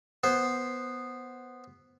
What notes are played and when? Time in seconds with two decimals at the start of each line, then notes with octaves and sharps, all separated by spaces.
0.24 B3 C5